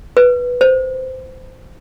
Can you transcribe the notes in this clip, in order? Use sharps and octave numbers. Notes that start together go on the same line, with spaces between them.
B4
C5